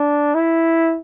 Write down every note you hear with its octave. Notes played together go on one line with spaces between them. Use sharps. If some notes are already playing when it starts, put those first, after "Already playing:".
Already playing: D4
E4